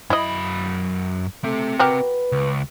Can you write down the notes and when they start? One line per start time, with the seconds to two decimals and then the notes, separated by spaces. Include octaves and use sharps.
0.10 F#2 E4 D#5 B5
1.44 A3 C4 E5
1.79 F#4 G4 A#4 B4
2.32 C#2